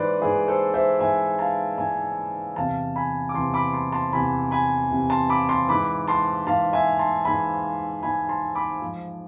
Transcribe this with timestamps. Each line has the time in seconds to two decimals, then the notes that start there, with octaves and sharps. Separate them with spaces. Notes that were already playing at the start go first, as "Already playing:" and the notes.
Already playing: G#2 E3 B4 C5 D5
0.21 G#2 E3 G#4 B4
0.48 A4 C5
0.74 C5 E5
1.00 G#2 E3 E5 G#5
1.39 F5 A5
1.78 G#2 E3 E5 G#5
2.56 E2 C3 E3 F5 A5
2.96 G#5 B5
3.29 D6
3.34 E2 C3 E3 A5 C6
3.54 B5 D6
3.73 A5 C6
3.92 A5 C6
4.12 E2 C3 E3 G#5 B5
4.51 G#5 B5
4.91 E2 C3 E3
5.10 A5 C6
5.29 B5 D6
5.49 A5 C6
5.68 G#2 E3 B5 D6
6.08 A5 C6
6.46 G#2 E3 F5 A5
6.73 E5 G#5
6.99 A5 C6
7.25 G#2 E3 G#5 B5
8.03 G#2 E3 G#5 B5
8.29 A5 C6
8.55 B5 D6
8.82 G#2 F3